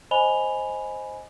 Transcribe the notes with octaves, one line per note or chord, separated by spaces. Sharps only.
C5 D#5 G#5 B5 F7 G7